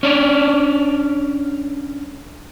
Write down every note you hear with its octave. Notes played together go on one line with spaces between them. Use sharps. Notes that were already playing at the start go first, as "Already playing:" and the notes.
C#4 D4